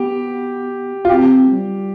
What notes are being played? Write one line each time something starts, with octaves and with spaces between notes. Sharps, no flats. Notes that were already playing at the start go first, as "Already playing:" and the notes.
Already playing: B3 G4
F4
C4 G4
G3